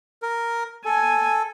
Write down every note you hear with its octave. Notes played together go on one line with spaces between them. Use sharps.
A#4
A4 G#5